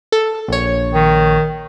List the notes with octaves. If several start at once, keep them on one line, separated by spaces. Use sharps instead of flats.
A4
A#1 C#5
D#3